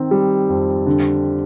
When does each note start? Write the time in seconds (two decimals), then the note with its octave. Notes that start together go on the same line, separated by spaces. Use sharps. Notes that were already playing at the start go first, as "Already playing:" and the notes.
Already playing: D#3 C4
0.11 G3
0.49 F2
0.86 D3